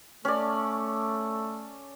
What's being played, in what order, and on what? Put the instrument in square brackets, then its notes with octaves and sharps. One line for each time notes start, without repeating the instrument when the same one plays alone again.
[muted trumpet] A3 [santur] C#4 D5